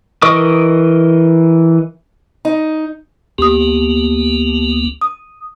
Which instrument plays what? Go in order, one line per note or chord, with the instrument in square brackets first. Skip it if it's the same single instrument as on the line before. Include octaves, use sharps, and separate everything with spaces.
[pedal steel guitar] E3 A#4 D#5 C#6 D#6
[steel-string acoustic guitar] D#4
[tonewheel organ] D2 A#3 B3 [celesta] G4 D#6
[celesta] D#6